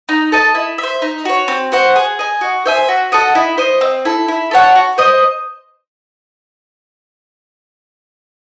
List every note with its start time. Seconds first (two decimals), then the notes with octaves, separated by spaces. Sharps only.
0.09 D#4
0.32 A4 D#5 A5
0.55 E4
0.78 E5
0.83 C5
1.02 D#4
1.25 F#4 C#5
1.48 C4
1.72 F#4 C5 F#5
1.96 G#4
2.19 D#5 G#5
2.41 F#4
2.66 C5 E5 G#5
2.88 F#4
3.12 A4 D#5 F#5
3.35 E4
3.58 C5 D#5
3.81 C4
4.05 E4 A4
4.28 E4
4.51 A4 C#5 F#5
4.75 F#4
4.98 C5 D#5